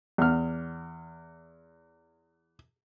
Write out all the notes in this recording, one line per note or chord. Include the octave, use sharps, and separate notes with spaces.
E2 F6